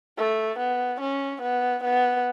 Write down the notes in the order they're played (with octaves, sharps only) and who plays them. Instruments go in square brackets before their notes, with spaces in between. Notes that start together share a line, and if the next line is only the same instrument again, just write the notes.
[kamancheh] A3
B3
C#4
B3
B3